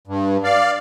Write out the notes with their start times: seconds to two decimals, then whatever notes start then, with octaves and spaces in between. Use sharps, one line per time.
0.07 G2
0.44 D5 F5